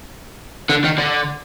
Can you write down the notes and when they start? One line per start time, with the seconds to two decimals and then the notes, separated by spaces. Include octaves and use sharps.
0.69 D3
0.84 D#3
0.98 D3